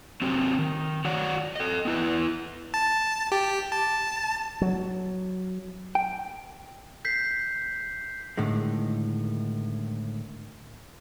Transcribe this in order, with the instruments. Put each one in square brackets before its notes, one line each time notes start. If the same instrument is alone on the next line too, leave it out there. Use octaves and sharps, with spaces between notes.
[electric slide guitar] F#3 C4 G4
D#3
F#4 C#5 D5 F#5
A4 D#5
B3 E4 B4
[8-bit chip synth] A5
G4
A5
[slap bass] F#3
[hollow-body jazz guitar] G5
[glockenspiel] G6 B6 C7
[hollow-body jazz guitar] A2 D3 D#3 G#3